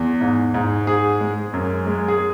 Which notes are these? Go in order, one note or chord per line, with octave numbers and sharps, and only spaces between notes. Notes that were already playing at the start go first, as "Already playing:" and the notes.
Already playing: E2
G#2
G#2
G#2 G#4
G#3
F#2
G#3
G#4